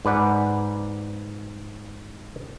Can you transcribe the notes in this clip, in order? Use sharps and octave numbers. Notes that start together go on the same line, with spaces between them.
G#2 B4 D5 F#5